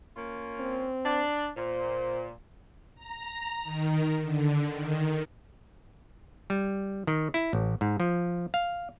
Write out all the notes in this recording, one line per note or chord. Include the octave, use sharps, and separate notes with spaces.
A#3 C#4 F4
C4
D4
A#2 C5
A#5
D#3
D3
D#3
G3
D#3
E4
A1
G#2
F3
F5